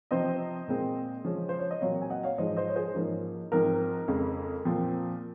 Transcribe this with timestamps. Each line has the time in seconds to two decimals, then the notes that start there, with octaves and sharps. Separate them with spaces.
0.11 C3 F3 C4 C5 D#5
0.68 A#2 G#3 C4
1.24 C#3 F3 G#3 C#4
1.49 C5
1.59 C#5
1.71 D#5
1.81 A#2 F#3 C4 C#5 F5
2.02 G#5
2.10 D#5 F#5
2.23 C#5 F5
2.38 G#2 F3 G#3 C5 D#5
2.56 C5 D#5
2.69 C#5
2.76 G#4 C5
2.95 G#2 F3 A#3 C#4
3.52 G#2 F3 C4 A#4
4.08 F2 C#3 G#3
4.65 A#2 F3 C4